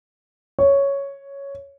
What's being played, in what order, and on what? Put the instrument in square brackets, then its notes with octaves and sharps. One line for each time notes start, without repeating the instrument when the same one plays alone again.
[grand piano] C#5